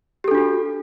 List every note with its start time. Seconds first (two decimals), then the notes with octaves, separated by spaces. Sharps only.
0.24 G4
0.28 A4
0.31 D4
0.35 F#4